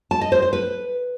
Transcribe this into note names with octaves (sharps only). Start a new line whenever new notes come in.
A5
D#5
C5
C5
B4